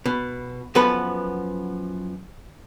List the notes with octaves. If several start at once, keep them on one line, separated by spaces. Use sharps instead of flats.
B2
F#2 F3 B3 A4 B4